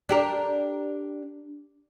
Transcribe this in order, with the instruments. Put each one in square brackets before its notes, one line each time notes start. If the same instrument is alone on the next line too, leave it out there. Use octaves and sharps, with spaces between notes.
[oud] D4 G4 A#4